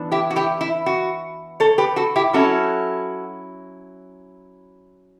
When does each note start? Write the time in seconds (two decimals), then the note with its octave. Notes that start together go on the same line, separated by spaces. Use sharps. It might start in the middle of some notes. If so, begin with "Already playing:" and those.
Already playing: E3 B3 D4
0.12 E4 G4
0.31 F#4
0.36 E4 G4
0.61 E4
0.86 F#4
1.60 A4 C#5
1.78 G4 B4
1.96 F#4 A4
2.16 E4 G4
2.33 F#3 C#4 E4 F#4 A4